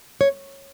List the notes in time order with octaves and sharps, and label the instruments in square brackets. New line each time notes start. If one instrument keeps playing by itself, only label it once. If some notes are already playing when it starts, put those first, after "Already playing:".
[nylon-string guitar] C#5